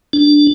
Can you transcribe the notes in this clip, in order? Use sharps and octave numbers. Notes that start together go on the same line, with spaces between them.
D4